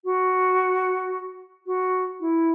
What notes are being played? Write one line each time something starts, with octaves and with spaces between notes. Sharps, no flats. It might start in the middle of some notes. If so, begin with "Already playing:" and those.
F#4
F#4
E4